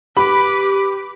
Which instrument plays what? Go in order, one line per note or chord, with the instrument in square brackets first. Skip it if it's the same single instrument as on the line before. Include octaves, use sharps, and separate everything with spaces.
[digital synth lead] G4 [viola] B4 D6 [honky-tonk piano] B5